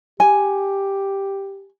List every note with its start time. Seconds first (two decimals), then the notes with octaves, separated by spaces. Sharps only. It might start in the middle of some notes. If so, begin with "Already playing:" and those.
0.20 G4 G#5